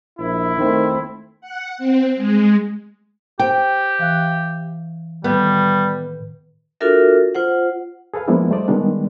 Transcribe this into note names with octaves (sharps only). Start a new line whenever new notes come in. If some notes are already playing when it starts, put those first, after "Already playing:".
A#1 E4
D#3 A3 C4
F#5
C4
G#3
G4 C5 G5
E3 F5 F#6
A2 D#3 G3 B3
D4 F4 F#4 A4 A#4 E5
F4 C5 F#5
G#4 A4 B4 F5
F3 G#3 A#3 B3 D4 E4
G3 A3 C5 D5 D#5
D#3 G3 G#3 B3 D4